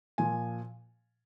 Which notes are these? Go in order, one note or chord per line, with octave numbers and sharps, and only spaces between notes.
A#2 F3 G#5